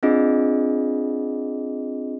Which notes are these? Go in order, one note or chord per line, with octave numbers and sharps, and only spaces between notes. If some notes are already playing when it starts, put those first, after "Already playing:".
C4 D4 F4 G#4 D#5